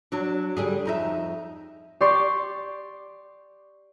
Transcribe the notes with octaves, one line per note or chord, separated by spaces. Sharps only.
F#3 D4
D3 G3 G#4
F2 D#4 E5
G4 D5 C6 C#6